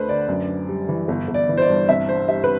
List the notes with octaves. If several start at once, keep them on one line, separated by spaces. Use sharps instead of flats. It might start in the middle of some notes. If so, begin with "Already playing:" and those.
Already playing: D2 A3 D4 B4 C5
D3 D5
F#2
D4
G3
E3
G1
G1
D5
E3
C5
D5
G2
C2 E5
D4 C5
G3 E5
B4